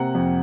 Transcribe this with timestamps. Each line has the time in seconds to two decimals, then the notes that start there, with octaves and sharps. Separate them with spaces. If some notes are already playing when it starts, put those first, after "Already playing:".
Already playing: C3 A#3 F#5
0.15 F2